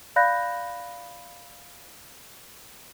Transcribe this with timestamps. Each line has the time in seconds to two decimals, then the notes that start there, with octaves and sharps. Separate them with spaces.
0.16 D5 F5 B5 F#6 G6 A#6